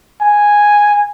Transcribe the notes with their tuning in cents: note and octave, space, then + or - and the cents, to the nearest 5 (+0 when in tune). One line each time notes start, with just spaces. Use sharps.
G#5 -5